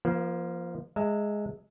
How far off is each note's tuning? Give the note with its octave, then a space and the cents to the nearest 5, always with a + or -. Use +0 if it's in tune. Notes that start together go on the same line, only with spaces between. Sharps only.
F3 -15 A#3 +25
G#3 +0 E5 +0 A#5 -40